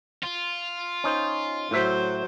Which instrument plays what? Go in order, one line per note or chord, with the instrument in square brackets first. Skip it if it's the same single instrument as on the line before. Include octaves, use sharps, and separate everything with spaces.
[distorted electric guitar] F4
[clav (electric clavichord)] C#4 D#4 C5
[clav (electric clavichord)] A2 E5 [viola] F#3 C5